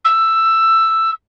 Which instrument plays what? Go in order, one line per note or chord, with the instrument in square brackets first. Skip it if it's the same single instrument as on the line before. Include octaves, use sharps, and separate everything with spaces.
[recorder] E6